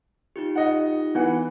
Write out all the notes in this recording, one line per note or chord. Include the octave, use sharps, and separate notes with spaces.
D#4 F4 G4
D#5 F#5
E3 B3 F#5